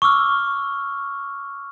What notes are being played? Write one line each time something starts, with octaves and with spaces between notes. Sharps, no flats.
C#6 D6 E6 F6